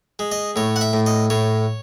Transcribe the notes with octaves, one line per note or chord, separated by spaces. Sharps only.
G#3
D#5
A2 C#5
F#5
E5
A2
D#5
A2 C#5